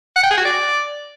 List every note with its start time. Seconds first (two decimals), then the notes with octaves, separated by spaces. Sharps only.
0.16 F#5
0.23 G5
0.30 G#4
0.38 F#4
0.45 D5